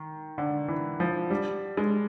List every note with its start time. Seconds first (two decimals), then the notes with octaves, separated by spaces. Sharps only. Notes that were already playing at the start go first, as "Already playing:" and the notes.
Already playing: D#3
0.38 D3
0.68 E3
1.00 F3
1.30 G3
1.77 G#3